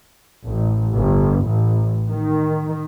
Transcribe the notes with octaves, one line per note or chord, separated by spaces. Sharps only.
A1
G1
A1
D#3